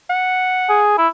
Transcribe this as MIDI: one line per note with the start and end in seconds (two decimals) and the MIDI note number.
0.10 0.86 78
0.69 0.94 68
0.98 1.08 64